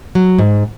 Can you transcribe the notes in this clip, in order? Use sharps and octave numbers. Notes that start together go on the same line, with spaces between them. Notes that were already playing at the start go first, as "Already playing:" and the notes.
F#3
G#2